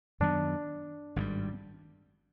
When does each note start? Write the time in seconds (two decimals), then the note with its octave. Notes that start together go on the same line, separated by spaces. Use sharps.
0.20 F#2 D#3 F#3 B3 D4
1.16 G#1 G2 D#3 G3